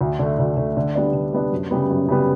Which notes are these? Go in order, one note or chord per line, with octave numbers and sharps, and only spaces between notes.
D2
D3 A3
D2
D3 A3
D3
G3 B3 D4
D3
G3 B3 D4
F#2
C#3 G3 B3
F#2
C#3 G3 B3